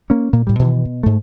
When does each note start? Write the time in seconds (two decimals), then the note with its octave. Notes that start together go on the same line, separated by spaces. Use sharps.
0.10 A#3 C#4
0.33 A#2 A#3
0.47 A2 G3
0.59 B2 D#3 E3
0.85 B2
1.03 G#2 A3